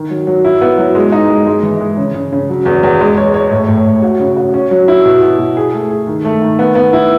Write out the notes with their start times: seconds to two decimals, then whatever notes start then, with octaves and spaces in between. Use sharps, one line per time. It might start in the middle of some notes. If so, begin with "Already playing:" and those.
Already playing: D#3
0.10 F#3
0.27 F#3
0.45 E4
0.61 B3
0.78 F#3
0.95 G#3
1.12 D#4
1.30 G#3
1.47 G#3
1.63 E3
1.81 G#3
1.97 C#3
2.14 C#3
2.33 C#3
2.50 F#3
2.66 E2
2.83 E2
3.01 G#3
3.17 C#5
3.34 C#5
3.51 A2
3.68 A2
3.86 A2
4.02 F#4
4.19 C#3
4.37 F#4
4.54 C#4
4.71 F#3
4.88 E4
5.06 B2
5.22 B2
5.39 B2
5.57 G#4
5.73 A3
5.90 G#4
6.07 D#3
6.25 A3
6.42 D#3
6.59 B3
6.75 B3
6.93 E4